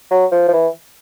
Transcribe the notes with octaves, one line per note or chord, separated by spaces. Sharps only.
F#3
F3
F3
E3